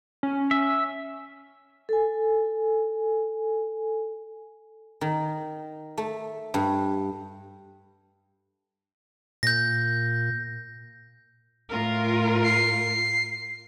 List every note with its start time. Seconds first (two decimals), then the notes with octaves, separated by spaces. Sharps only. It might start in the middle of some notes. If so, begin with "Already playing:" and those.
0.23 C#4
0.51 E5
1.89 A4 G#5
5.01 D#3
5.97 A3
6.54 G2
9.43 A#2 G6 A#6
11.71 A2 F4 A#4
12.43 C7